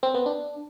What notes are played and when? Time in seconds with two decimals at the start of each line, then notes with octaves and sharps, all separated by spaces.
0.03 C4
0.14 B3
0.26 D4